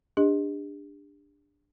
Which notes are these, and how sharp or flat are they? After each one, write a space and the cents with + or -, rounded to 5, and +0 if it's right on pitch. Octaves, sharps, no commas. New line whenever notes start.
D4 +0 G4 +45 D#5 +0